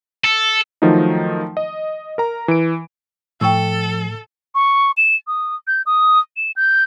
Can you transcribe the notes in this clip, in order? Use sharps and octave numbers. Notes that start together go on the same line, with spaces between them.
A4
D#3 F3 F#3 A3 D#4
D#5
A#4 A#5
E3 D7
A2 F3 A4 G5 C#6 E6
C#6
E7
D#6
G6
D#6
E7
G6